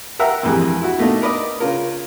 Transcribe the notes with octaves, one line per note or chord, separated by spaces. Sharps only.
A#4 E5 F#5 G5 A#5
A#1 F2 E3 G3 G#4
E4 F#4
B2 A3 A#3 D#4
A#4 B4 D5 D#5
C#3 F4 A#4